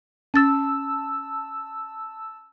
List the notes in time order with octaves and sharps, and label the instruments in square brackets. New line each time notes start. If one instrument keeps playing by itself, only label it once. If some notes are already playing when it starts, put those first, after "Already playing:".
[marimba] C#4 A6 [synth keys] A5 E6